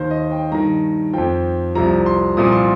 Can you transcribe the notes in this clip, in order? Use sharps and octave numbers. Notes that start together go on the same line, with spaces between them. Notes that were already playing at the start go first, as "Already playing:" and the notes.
Already playing: D#2 D#3 C5
D#5
G5
G2 D#3 A#5
F2 F3 G5
C2 C3 F3 A#5
C6
C2 A#2 F3 D#6
C6